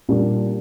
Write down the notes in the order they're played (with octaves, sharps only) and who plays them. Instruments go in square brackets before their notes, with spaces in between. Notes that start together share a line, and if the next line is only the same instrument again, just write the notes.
[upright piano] A#2 G3 A#3 D4